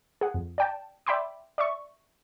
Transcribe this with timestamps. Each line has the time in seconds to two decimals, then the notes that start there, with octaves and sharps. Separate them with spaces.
0.21 G#4 F#5
0.34 F2
0.58 D5 G5 A5
1.06 D5 E5 G5 B5 C6 D6
1.58 D5 E5 C#6